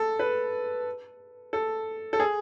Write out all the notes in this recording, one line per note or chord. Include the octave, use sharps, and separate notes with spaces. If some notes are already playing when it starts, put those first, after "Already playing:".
Already playing: A4
B4
A4
A4
G#4